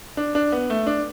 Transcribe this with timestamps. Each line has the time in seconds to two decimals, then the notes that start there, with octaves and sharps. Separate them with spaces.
0.17 D4
0.35 D4
0.52 B3
0.70 A3
0.87 D4